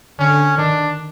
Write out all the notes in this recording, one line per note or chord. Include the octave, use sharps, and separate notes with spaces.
D3 C#4
D#3 D4